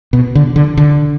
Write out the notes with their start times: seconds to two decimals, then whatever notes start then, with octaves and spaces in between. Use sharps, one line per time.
0.13 B2
0.35 D3
0.56 D3
0.77 D3